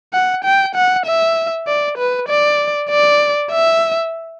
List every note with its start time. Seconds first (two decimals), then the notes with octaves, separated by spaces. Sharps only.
0.13 F#5
0.44 G5
0.75 F#5
1.06 E5
1.67 D5
1.98 B4
2.29 D5
2.90 D5
3.52 E5